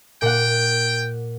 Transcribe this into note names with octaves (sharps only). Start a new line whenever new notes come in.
A#2 F#5 G5